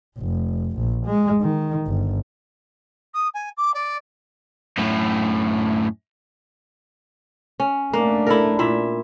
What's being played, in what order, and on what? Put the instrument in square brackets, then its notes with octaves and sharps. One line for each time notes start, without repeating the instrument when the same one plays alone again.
[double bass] F1
A#1
G#3
D#3
G1
[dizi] D#6
G#5
D6
D5
[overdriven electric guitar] F#2 A2
[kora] C#4
[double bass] A3 D4 [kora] A#3
[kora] E4 A4 A#4
A#2 E4 E5